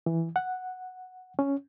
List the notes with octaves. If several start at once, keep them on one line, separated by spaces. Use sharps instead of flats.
E3
F#5
C#4